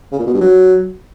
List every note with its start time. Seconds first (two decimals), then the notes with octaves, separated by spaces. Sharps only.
0.12 C#3
0.19 A#2
0.27 B2
0.34 G2
0.41 F#3